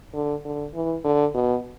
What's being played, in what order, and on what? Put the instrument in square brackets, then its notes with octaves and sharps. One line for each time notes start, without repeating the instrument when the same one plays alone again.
[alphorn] D3
D3
E3
D3
B2